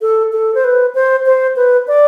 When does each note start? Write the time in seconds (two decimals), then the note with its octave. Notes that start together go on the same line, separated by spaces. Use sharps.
0.01 A4
0.32 A4
0.55 C5
0.64 B4
0.95 C5
1.26 C5
1.56 B4
1.87 D5